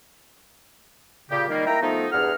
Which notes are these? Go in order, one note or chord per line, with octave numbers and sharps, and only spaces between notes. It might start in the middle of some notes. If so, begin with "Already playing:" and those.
A#2 C#3 G4
D#3 G3 A#3
A#3 E4 G5 A#5
F3 A3 B3 D#4
E2 G2 G#4 F#5 F6